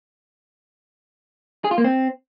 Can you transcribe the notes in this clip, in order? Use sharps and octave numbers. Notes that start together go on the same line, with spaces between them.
G#4
F4
A#3
C4